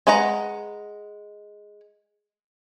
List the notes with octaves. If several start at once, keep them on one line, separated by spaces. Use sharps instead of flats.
G#3 B4 F#5 A#5